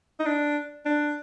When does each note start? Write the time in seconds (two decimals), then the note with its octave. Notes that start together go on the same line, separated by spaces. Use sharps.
0.20 D#4
0.26 D4
0.85 D4